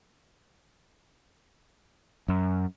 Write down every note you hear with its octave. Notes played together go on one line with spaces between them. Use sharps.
F#2